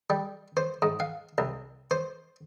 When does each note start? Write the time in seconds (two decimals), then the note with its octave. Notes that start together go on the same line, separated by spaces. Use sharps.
0.10 G3
0.57 C5
0.82 G#2
1.00 F5
1.38 C2
1.91 C5